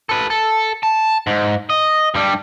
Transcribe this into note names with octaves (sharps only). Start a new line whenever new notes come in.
A4 B4
A4
A5
G#2
D#5
G2 G3